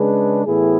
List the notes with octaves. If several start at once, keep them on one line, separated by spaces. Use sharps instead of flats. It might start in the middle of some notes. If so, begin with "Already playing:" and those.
Already playing: C#3 G#3 D4 G#4 B4
A2 E3 B3 E4 G#4